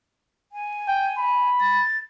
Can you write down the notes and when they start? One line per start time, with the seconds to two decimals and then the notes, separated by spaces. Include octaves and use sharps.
0.52 G#5
0.88 G5
1.18 B5
1.61 A6